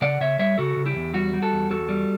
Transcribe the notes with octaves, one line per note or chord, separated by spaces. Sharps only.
C#3 D5 F#5
C#3 C#5 E5
G3 C#5 E5
C#3 F#4 A4
C#3
E4 G4
E2
G3 F#4
G3
F#4 A4
E2
E2 F#4 A4
G3